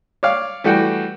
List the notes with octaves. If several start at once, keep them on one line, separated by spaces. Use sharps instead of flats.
C#5 D5 F5
E3 G3 A3 F#4 F#5 G5